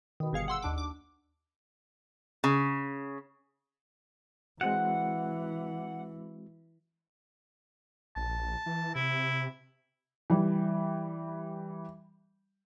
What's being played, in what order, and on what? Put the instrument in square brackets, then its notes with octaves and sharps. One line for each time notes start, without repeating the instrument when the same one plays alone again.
[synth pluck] B2 D#3
G1 G#4 F5 C#7
F#5 C6 E6
D#2 D4 D6
D6
[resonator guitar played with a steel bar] C#3
[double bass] E3 [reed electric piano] G#3 C4 F#4 [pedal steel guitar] F#5
[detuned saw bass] A#1 [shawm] A5
[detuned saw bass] E3
[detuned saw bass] C3 [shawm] E4
[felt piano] E3 G3